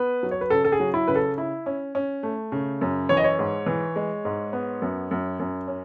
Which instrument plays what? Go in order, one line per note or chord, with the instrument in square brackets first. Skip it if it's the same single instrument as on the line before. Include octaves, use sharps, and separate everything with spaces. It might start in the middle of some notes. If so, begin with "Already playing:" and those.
Already playing: [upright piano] B3 [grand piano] B4
[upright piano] F#3
[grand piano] C#5
B4
[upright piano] C#3 [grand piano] A4
[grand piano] A4
G#4
[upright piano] F#3
[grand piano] E4
[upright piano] C#3 [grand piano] B4
[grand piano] A4
[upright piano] E4
C#4
C#4
A3
C#3
F#2
[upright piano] E3 [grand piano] C#5
[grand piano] D#5
C#5
[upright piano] G#2
E3
G#3
G#2
B3
F#2
F#2
F#2
C#4